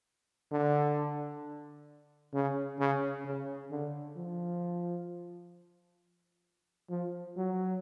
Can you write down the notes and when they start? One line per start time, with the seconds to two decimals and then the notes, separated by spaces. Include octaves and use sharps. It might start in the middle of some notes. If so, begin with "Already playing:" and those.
0.51 D3
2.34 C#3
2.79 C#3
3.25 C#3
3.71 D3
4.17 F3
6.90 F3
7.37 F#3